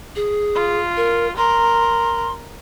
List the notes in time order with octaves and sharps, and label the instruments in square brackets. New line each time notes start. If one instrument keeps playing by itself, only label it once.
[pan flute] G#4
[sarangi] F4
[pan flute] A#4
[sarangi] A#4 [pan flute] C6